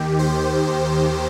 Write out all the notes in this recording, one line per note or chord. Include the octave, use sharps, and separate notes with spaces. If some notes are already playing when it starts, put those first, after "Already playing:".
Already playing: D#2 D#3 G4
C5